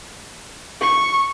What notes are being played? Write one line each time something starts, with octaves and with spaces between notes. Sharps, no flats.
C#6